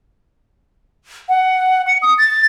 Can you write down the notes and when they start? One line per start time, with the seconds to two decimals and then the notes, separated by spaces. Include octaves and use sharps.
1.29 F#5
1.87 C#7
2.02 D#6
2.18 A6